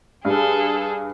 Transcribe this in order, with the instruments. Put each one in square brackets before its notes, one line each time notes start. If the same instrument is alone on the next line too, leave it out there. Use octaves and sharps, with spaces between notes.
[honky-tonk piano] G2 [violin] G#4 A4